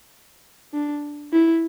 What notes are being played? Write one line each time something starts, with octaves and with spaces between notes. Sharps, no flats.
D4
E4